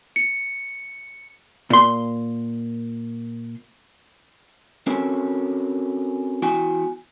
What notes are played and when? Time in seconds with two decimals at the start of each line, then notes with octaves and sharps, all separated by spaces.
0.16 C#7
1.70 A#2 C6
4.87 C4 C#4 F#4 A4 A#4 C#5
6.42 E2 E4 F#4 G5 G#5